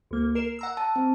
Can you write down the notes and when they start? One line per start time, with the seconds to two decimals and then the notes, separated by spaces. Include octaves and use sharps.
0.11 D2 A#3
0.35 A#4 C7 E7
0.59 F#5 A#5 E6
0.77 A5
0.96 C4